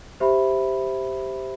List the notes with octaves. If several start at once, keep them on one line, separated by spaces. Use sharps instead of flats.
G4 C5 E5 B5